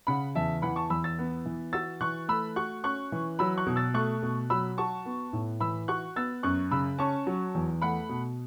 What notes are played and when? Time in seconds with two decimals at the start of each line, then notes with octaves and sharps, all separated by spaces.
0.07 C#3 F#5 B5
0.35 E2 E5 A5
0.62 E3 F#5 B5
0.76 A5 C#6
0.90 E2 B5 E6
1.04 E6 A6
1.19 B3
1.46 E3
1.73 F#4 E6 A6
2.01 E3 C#6 F#6
2.28 A3 B5 E6
2.56 F#4 C#6 F#6
2.84 C#4 C#6 F#6
3.12 E3
3.39 F#3 B5 E6
3.57 C#6 F#6
3.66 B2
3.76 E6 A6
3.94 A3 C#6 F#6
4.22 B2
4.50 F#3 B5 E6
4.78 F#4 A5 C#6
5.05 B3
5.33 A2
5.60 E3 B5 E6
5.88 F#4 C#6 F#6
6.16 B3 E6 A6
6.43 F#2 C#6 F#6
6.71 C#3 B5 E6
6.99 C#4 A5 C#6
7.27 F#3
7.55 E2
7.82 A3 F#5 B5
8.09 B2